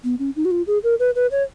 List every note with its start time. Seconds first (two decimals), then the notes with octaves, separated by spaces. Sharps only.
0.04 B3
0.19 C#4
0.36 D#4
0.45 F#4
0.51 F4
0.67 G#4
0.84 A#4
0.99 B4
1.15 B4
1.31 C#5